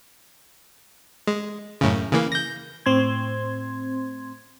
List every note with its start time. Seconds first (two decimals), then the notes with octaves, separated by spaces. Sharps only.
1.27 G#3
1.81 F#2 A2 C#3
2.13 C#3 E3 A#3
2.32 G6 A#6
2.86 A2 C4 C6 G#6